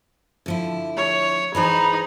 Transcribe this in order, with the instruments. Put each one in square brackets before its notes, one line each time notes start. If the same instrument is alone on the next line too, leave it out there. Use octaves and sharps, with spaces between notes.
[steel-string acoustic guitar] D3 F3 E4
[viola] C#5
[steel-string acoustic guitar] E3 G#4 C5 [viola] D#4 [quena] B5